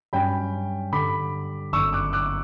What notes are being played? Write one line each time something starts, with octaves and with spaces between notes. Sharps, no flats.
G2 F#3 C#4 G5 B5
G2 D3 G3 B5 D6
G1 F#2 D3 F#3 C#6 E6
D6 F#6
D6 F#6